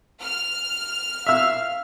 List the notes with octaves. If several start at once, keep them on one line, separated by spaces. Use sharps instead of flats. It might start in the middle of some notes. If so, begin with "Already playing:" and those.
F6
E5 F5 E6